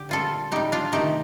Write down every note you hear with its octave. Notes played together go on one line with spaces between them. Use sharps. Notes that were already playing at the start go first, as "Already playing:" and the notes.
Already playing: D3 G4
A#2 G3 F4 A4
A2 G3 D#4 G4
D4 F4
C3 D#3 A3 D#4 G4